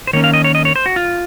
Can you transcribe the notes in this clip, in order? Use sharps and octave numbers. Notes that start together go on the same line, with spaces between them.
C5
D#3 A#3 C#4 C#5
F5
D#5
C#5
D#5
C#5
C5
F#4
F4